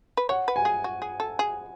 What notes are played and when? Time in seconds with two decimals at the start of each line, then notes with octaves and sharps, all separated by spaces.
0.17 B4
0.29 C#5 F#5
0.48 B4
0.56 G#5
0.65 G#4
0.84 F#4
1.02 G#4
1.20 A4
1.39 G#4